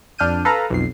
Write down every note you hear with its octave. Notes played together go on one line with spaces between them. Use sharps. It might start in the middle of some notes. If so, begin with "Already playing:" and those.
F2 D4 F6 G6 D#7
A4 B4 F5 A#5
B1 F2 C7